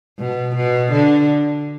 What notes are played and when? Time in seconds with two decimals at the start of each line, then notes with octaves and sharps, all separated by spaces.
0.19 B2
0.56 B2
0.92 D3